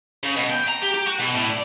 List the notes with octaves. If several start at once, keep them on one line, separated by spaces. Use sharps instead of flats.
C#3
B2
G5
A#5
G4
G4
F#4
B2
A2
D5